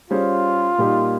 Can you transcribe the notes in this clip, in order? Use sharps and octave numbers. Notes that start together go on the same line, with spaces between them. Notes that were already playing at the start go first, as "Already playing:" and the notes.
G3 C#4 F4 G#4 C5
A#2 G3 A#3 D#4 G4